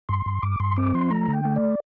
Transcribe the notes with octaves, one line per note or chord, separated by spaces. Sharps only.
G2 C6
G2
G2 D6
G2 C6
C4 D6
F3 C6
A3 A#5
D3
G5
A3
D5